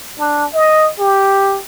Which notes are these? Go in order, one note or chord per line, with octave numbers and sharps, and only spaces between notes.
D4
D#5
G4